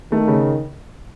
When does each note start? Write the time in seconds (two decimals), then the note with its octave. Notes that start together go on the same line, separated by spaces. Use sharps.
0.12 D#3 A3
0.27 C#3